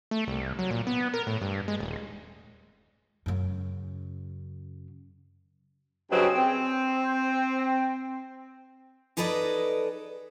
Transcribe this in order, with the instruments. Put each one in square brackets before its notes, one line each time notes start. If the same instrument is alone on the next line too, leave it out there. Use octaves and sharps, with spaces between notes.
[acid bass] A3
C2
F#3
A#2
B3
A#4
A2
G2
G#3
D#1
[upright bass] F#2 C#3
[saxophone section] G2 C#3 F#3 C4 B4 D#5
C4
[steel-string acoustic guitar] D#4 G#4 A4 B4 D5 D#5